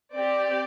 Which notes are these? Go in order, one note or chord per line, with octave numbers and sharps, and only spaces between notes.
C4 G4 D5